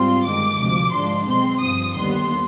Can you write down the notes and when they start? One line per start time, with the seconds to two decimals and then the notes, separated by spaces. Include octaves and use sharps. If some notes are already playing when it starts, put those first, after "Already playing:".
Already playing: G#2 G3 C4 F4 C6
0.25 G1 G2 D#3 G#3 D6
0.59 D2 C3 F3 G#3
0.94 G#2 F3 G#3 D4 C6
1.28 B1 B2 G#3 C4 C6
1.62 G1 G2 F3 D#6
1.96 D#2 D3 G3 B3 C6